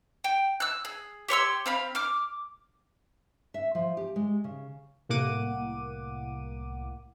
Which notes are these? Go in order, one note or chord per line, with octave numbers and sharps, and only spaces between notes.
G5
E6 F#6
G#4
G4 C#5 C6 E6
C4 F5 B5
D6 F6
E5
F3
G4
G#3
C#3
C2 A2 A#3 F#5 D6 D#7